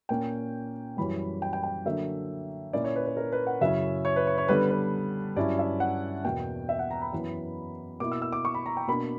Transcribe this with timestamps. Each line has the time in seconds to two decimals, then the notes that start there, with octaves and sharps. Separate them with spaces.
0.09 A#2 A#3 C#4 G5
0.97 F#2 E3 G3 B5
1.42 G5
1.53 G5
1.63 G5
1.85 D3 F#3 A#3 D4 E5
2.73 A#2 A#3 C#4 E4 D5
2.84 C#5
2.96 B4
3.06 B4
3.17 A#4
3.32 B4
3.47 F#5
3.61 F#2 C#3 F#3 C#4 E4 E5
4.05 C#5
4.16 B4
4.27 C#5
4.38 C#5
4.48 D3 G3 B3 D4 B4
4.71 B4
5.36 G2 F#3 C#4 E4 D5
5.59 E5
5.80 F#5
6.24 E2 B2 A#3 G5
6.69 E5
6.79 F#5
6.91 A#5
7.02 B5
7.13 F#2 E3 B3
8.00 B2 A#3 E4 D6
8.11 E6
8.22 E6
8.33 D6
8.45 C#6
8.54 B5
8.66 A#5
8.77 G5
8.87 B2 A#3 D4 B5